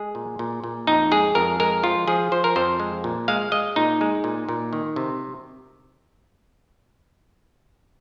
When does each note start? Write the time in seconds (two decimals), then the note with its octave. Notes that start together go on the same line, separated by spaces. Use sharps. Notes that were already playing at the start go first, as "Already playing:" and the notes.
Already playing: G#3 G#4
0.15 A#2
0.39 A#2
0.64 A#2
0.87 F2 D#4
1.11 G#3 G#4
1.35 F2 A#4
1.60 G#3 A#4
1.83 F3 F4
2.08 F3 G#4
2.32 F3 C5
2.44 A#4
2.56 F2 C5
2.80 G#3
3.04 A#2
3.28 G#3 F5
3.52 G#3 D#5
3.76 A#2 D#4
4.01 G#3
4.24 A#2
4.49 A#2
4.73 D#3
4.96 C3